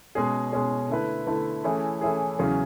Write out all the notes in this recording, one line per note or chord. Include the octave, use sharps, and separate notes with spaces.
B2 G#3 C#4 G#4
B2 G#3 C#4 G#4
D3 A3 E4 B4
D3 A3 E4 B4
E3 A3 C#4 E4 G#4
E3 A3 C#4 E4 G#4
E2 C#3 F#3 C#4 G#4